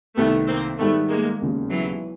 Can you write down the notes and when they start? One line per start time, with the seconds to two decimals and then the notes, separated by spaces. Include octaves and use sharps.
0.16 C2 C3 D#3 A3 B3
0.47 A#3 C4
0.79 G#2 D#3 G3 A3 B3
1.09 G#3 A#3
1.41 E1 D#2 C#3
1.72 E3 F#3